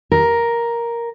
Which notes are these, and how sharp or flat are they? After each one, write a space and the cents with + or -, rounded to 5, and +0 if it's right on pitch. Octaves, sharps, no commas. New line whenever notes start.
A#4 +5